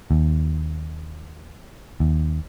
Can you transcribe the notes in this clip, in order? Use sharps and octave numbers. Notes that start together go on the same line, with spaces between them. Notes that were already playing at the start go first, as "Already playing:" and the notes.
D#2
D#2